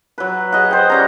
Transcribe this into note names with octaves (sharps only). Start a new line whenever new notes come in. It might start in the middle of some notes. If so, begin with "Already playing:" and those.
F#3 B4
G#4 D#5 F#5
C5 G5
G3 C#4 A#5